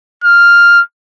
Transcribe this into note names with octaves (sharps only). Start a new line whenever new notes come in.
F6